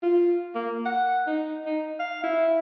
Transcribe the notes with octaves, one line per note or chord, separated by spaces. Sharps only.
F4
A#3
F#5
D#4
D#4
F5
E4